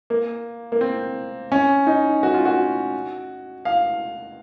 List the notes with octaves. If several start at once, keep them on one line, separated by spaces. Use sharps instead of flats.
A#3
A#3
C4
C#4
D#4
F#4
F4
F#4
F5